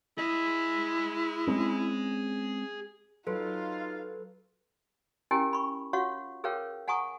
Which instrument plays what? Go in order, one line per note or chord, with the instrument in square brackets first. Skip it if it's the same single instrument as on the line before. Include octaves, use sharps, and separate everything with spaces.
[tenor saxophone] E4 [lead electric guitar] G#4 D#5
[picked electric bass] G#3 C4 C#4
[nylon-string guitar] F#3 [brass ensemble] D#4 F4 [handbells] A4 B4 C6 [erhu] F5
[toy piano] C#4 E4 G4 A#4 G5 G#5
B5 C#6
F4 F#4 C#5 F5 F#5 C#6
G#4 A#4 B4 C#5 F5 G5
F#5 G#5 A#5 C#6 D#6